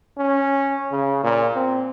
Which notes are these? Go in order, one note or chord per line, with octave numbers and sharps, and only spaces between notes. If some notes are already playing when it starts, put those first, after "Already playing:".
C#4
C#3
A#2
C4